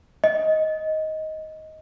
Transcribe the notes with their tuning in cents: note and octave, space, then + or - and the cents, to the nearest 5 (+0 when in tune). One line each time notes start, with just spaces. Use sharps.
D#5 +10